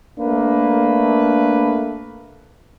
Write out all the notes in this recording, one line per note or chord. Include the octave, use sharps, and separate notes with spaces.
A3 A#3 D4 B4